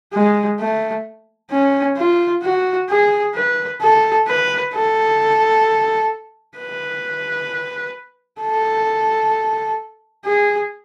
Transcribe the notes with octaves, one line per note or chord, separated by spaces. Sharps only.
G#3
A3
C#4
F4
F#4
G#4
B4
A4
B4
A4
B4
A4
G#4